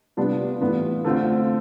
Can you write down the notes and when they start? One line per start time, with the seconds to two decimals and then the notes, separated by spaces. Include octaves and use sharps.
0.17 C3 G3 B3 D4 F4
0.60 A2 E3 B3 F4
1.04 D3 A3 C4 F4